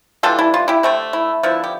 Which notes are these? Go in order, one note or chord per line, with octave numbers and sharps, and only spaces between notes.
E3 G3 D4 F4 A4
E4
F4
E4 G4
D3 A3 C4
E4
D3 F3 B3 E4
G4